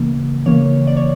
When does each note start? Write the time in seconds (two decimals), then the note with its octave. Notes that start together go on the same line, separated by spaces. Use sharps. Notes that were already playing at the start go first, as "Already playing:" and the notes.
Already playing: C#3 E3 A#3
0.46 C#3 E3 A#3 C#5
0.87 D5
0.97 C#5